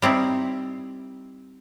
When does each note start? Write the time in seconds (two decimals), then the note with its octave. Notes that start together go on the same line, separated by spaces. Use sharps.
0.02 G3 C4 D#4 E4